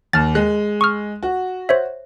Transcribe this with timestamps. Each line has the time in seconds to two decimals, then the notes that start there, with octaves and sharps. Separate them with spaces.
0.13 D#2 A5 F6 A6
0.35 G#3 F#6
0.81 C#6 D#6 F6
1.23 F#4
1.69 C5 C#5 E5